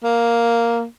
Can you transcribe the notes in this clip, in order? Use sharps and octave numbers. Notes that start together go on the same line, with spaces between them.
A#3